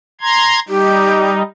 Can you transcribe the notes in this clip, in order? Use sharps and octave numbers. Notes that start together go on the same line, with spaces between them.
A#5 C6 G#6
G3 D#4 G4